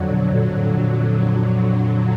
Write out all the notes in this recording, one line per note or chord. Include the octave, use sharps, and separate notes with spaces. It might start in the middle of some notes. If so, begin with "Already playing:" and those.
Already playing: F2 D3 F#3
B2
A#2
A2
A#2